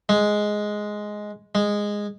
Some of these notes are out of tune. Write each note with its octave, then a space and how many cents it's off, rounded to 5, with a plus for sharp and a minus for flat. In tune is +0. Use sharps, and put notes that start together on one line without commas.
G#3 +5
G#3 -10